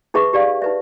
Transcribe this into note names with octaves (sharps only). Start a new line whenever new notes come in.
D#4 G#4 B4 E5 C#6
G4 D5 F5
D#4 B4 E5